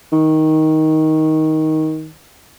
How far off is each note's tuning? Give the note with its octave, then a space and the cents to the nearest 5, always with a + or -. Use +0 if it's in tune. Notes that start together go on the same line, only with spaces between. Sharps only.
D#3 +15